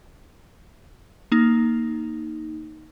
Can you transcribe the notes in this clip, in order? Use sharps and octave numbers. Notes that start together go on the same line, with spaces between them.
A#3 D#4